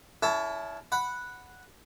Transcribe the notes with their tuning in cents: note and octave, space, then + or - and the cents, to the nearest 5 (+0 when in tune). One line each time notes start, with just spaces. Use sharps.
C#4 +35 E4 +0 A4 +0
F#5 -5 B5 +0